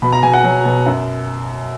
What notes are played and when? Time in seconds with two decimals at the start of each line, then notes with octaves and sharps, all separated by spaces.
0.02 B2 B5
0.12 A#5
0.23 B2 G#5
0.33 F#5
0.44 F#3
0.65 B2
0.86 F#2